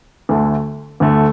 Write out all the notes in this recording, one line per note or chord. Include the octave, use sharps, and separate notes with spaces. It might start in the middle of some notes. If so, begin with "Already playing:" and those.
D2 D3 A3
D2 D3 A3